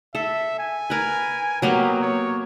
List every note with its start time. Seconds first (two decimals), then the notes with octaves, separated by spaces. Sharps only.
0.15 A4 E5
0.59 G#5
0.90 A#4 B4
1.62 F#3 A#3 B3 G4
2.02 C#5